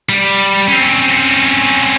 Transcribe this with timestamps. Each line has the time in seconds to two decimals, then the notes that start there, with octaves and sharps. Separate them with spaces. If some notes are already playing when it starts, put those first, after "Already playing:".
0.09 G3
0.68 C4 C#4